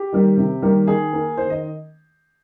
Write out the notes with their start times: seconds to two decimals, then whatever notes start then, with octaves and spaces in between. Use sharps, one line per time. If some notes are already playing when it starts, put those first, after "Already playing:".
Already playing: G4
0.13 D#3 G3 A#3
0.37 C3
0.62 D#3 G3 A#3
0.87 D#3 G#4
1.13 A#3
1.37 D#3 C5
1.50 D#5